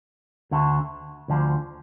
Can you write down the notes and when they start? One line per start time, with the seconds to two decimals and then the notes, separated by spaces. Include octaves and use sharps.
0.51 D2 D3 A3
1.28 D2 D3 F3